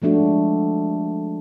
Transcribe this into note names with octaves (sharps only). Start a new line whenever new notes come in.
F3 G#3 A3 D4 F#4